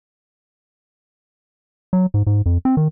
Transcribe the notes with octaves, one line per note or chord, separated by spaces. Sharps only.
F#3
G#2
G#2
F2
C4
D#3